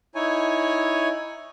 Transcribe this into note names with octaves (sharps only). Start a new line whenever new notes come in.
D#4 E4 C#5 G#5